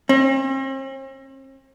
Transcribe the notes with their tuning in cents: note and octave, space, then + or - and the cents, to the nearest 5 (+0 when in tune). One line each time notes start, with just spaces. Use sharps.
C4 +45